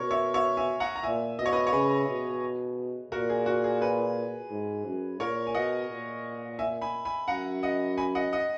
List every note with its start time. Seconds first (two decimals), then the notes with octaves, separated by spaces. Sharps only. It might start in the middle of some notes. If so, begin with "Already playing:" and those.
Already playing: B2 A#4 C#5
0.11 C#5 E5
0.34 C#5 E5
0.57 E5 G#5
0.80 F#5 A#5
0.96 A#5
1.03 A#2 E5 G#5
1.38 B2 D#5
1.46 C#5
1.53 B4 D#5
1.67 C#5
1.73 C#3 G#4 B4
2.08 B2
3.12 A#2 F#4 A#4
3.30 G#4
3.46 F#4
3.64 G#4
3.81 G#4 B4
4.50 G#2
4.86 F#2
5.20 A#2 A#4 C#5
5.47 G#5
5.54 B2 D#5 F#5
5.89 A#2
6.59 E5 G#5
6.81 G#5 B5
7.05 G#5 B5
7.28 F#2 F#5 A#5
7.63 D#5 F#5
7.97 G#5 B5
8.15 D#5 F#5
8.32 D#5 F#5